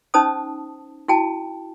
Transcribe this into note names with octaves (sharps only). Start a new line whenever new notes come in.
C#4 D#4 C5 A5 D#6
E4 F#4 G5 A5